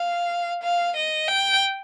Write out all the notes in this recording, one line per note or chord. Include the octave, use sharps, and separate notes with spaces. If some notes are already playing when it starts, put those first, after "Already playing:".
Already playing: F5
F5
D#5
G5